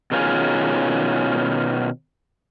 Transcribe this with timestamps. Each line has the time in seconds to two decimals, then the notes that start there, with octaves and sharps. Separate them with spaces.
0.12 B2 D#3 C#4 F4 G#4